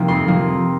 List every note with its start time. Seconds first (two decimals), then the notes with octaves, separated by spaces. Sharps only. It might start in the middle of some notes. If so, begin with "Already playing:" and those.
Already playing: C3 F3 A#3 C4 D#4
0.08 F2 C6
0.27 C3 F3 A#3 D#4